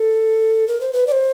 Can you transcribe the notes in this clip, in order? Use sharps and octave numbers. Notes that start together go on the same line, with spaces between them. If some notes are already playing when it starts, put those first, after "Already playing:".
Already playing: A4
A#4
C5
B4
D5
C5